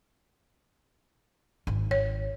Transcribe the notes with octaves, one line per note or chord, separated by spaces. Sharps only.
G#1
C#5